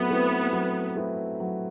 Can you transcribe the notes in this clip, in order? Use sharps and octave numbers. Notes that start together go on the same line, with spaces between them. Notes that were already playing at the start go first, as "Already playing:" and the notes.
Already playing: F#3 A3 B3 C4 E4
A3 C4 E4 B4
F#3
A3 C4 E4 B4
F#3